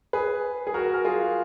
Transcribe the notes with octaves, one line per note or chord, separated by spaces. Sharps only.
G#4 B4
G#4
F#4 A#4
A#4
F4 G#4